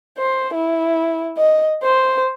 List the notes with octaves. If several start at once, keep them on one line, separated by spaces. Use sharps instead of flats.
C5
E4
D#5
C5